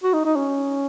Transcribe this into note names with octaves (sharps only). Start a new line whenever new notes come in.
F#4
D#4
D#4
C#4